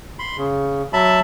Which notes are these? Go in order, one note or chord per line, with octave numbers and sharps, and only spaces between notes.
B5 C6
C#3
F#3 E5 A5 B5